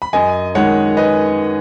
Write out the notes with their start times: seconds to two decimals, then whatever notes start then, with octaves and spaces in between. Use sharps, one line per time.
0.02 B5
0.13 F#2 D#5 G#5
0.55 D#3 G#3 C#5 F#5
0.97 B4 D#5